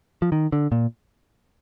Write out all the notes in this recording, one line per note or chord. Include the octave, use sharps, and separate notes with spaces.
F3
D#3
D3
A#2